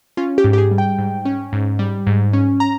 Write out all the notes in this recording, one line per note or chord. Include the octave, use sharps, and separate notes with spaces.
C#4 F4
G4
G#2
G4
G#4
G3
G5
G#2
C#4
G#2
G3
G#2
C#4
A#5